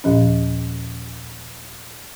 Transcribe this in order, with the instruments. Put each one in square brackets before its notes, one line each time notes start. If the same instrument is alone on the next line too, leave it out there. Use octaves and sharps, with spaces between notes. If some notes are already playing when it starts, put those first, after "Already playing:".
[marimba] D#2 A#2 F3 C#4